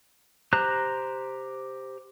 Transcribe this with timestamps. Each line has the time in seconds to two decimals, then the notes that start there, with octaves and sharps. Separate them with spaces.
0.53 G4 C5 A#5 F#6